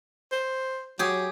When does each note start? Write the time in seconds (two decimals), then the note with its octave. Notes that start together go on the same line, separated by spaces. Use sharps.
0.32 C5
0.99 F#3 G4 G#4